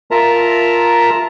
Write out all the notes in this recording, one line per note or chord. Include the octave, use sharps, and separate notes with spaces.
F4 A#4 E5 A5 A#5